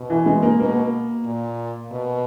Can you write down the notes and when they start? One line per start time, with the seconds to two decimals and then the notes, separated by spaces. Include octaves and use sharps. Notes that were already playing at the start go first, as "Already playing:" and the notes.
Already playing: B2
0.10 E3
0.26 G#3
0.42 A#3
0.60 B2 A#3
1.25 A#2
1.91 B2